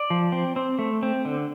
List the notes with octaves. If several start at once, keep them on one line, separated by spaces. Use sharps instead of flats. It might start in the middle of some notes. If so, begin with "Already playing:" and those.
Already playing: D5
F3
C4
C4
A3
C4
D3